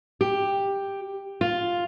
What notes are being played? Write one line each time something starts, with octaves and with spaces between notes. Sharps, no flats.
G4
F4